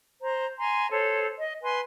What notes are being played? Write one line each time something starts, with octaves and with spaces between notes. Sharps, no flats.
C5 A#5
G#5 A#5 C6
A4 C5 C#5
D#5
B4 G#5 C6